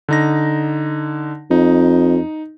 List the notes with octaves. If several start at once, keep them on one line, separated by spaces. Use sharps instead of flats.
D3 D#4 A#6
F2 D#4